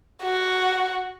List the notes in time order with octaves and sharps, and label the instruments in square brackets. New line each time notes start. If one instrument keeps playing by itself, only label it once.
[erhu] F#4